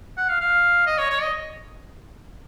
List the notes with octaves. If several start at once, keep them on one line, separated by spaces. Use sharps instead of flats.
F#5
F5
F5
D#5
C#5
C#5
D#5